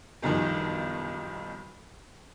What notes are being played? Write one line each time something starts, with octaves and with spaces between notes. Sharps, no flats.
F#1 B1 G2 D#3 F3